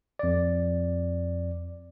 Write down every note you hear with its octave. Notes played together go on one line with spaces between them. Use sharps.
F2 D5